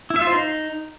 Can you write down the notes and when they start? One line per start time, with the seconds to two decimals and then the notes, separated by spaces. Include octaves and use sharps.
0.10 E4
0.16 E5
0.21 F4
0.27 C5
0.33 D#4